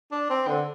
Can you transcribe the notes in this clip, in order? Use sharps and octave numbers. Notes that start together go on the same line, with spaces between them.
D4
C4
D3